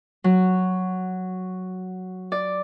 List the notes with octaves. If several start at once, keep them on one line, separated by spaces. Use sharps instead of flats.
F#3
D5